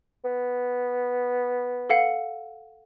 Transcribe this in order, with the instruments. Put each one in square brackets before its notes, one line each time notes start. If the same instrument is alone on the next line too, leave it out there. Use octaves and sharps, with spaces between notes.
[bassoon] B3
[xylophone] A4 F5 F#5